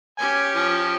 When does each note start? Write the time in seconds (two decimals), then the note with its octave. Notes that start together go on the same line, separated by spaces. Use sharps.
0.18 C#4 G4 G#5
0.55 F3